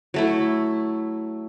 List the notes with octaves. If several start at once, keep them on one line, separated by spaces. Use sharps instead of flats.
F#3 A3 E4